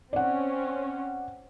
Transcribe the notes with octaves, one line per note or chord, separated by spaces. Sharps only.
C4 C#4 D5 F#5